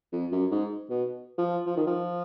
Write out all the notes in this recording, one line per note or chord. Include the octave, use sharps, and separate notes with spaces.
F2
F#2
G#2
B2
F3
F3
D#3
F3